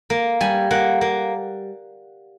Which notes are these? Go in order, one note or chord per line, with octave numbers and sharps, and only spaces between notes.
A#3
G3 G#5
A#3 F#5
A#3